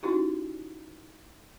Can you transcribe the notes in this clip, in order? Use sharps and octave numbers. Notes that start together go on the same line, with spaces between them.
C#4 D#4 E4 F#4 G4